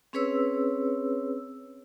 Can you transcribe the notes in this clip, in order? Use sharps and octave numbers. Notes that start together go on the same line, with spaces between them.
C4 C#4 G#4 B4 C#5 E6